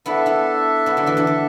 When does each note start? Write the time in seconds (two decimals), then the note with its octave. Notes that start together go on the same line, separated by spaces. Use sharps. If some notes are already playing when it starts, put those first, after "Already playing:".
0.06 B3 D4 E4 A4 E5
0.26 B3 E4
0.86 F#3 B3
0.97 D3 F#3
1.06 E3 A3
1.17 D3 F#3
1.27 D3